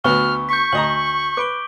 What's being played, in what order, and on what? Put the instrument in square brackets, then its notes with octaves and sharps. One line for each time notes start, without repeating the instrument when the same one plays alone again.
[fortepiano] D2 B3 F#4 [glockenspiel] C#6 [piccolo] F6
[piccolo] C#6 [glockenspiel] G6 B6
[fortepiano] D2 D#5 A#5 [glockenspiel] F#7
[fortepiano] B4 [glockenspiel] D6 D7 G7